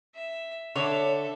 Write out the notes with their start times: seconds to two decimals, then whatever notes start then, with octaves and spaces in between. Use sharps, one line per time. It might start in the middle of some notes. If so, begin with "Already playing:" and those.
0.15 E5
0.76 D3 A4 C#5 E5